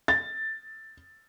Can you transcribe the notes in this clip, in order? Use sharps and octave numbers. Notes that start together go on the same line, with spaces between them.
A6